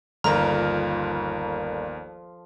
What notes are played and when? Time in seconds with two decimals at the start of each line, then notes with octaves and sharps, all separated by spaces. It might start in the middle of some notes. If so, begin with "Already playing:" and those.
0.24 G1 D#2 F3 A4 A#4 A#5 F6